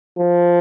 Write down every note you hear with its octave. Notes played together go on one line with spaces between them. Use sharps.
F3